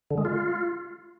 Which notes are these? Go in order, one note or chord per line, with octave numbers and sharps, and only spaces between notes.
D3
G#3
F4